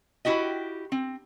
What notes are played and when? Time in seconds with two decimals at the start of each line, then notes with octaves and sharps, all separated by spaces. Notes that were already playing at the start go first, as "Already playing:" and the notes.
0.25 E4 F#4 G4 D#5
0.92 C4